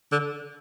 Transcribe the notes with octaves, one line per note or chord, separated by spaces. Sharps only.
D3